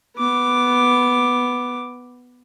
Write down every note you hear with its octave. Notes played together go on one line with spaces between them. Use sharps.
B3 D6